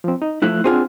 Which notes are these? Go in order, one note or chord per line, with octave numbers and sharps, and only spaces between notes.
F3 C4
D#4
F3 A3 E4 F#6
C4 D4 F4 G#4 C5 F#5